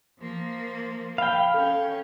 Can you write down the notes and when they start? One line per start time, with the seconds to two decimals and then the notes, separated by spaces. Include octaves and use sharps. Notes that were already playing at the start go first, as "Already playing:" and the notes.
0.19 F3 A#3
1.18 F5 G5 B5
1.54 C#4 A4